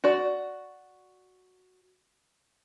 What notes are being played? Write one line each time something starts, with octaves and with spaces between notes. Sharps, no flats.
F#4 D5